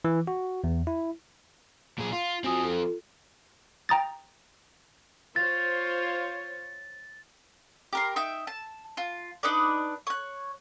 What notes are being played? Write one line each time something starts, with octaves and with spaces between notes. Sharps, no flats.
E3
F#4
E2
E4
A#2 G#4
F4
F3 C4 F#4 G#5 D#6
F4 A4
G5 A#5 D#6 A6
F4 C5 C#5 A6
G4 A#4 C6
D#4 E5 G5
A5
F4
D4 D#4 B4 D5
C#5 F#6